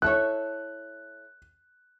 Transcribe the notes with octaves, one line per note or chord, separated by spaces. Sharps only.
E4 A4 C#5 F#6